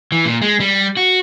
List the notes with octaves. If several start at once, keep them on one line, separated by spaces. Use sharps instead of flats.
E3
A#2
G#3
G3
F#4